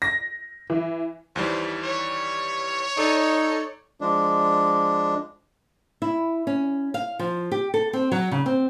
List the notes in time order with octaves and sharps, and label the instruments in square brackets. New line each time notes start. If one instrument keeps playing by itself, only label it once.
[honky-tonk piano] A#6
E3
[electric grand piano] D#2 E3 G3 [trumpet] C5
[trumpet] C#5
[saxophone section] D#4 A4 [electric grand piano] D5
[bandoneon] F3 G#3 D4
[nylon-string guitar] E4
C#4
F5
F3
G4
A4
C4
F#3
C#3
C4